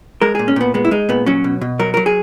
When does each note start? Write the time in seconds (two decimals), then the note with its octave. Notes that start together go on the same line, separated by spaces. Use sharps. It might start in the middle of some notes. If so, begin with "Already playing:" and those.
0.22 G#3 A#4
0.35 A#2 G#4
0.48 C#4
0.56 A#2 B3
0.74 G#3 B3
0.85 E4
0.91 G#3 D#4
1.09 A#2 B3
1.26 F#3 C#4
1.44 B2
1.61 B2
1.79 F#3 A#4
1.94 F#3 A#4
2.06 G#4